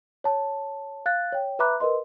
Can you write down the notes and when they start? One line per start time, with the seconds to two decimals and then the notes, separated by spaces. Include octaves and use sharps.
0.24 C#5 A5
1.06 F5 F#6 A6
1.32 C#5 G5
1.59 B4 E5 A#5 B5 D6 F#6
1.80 A#4 B4 D#5 C6